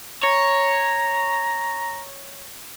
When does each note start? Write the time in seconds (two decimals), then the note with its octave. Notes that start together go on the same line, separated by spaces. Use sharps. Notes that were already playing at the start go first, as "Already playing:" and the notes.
0.24 C#5 A#5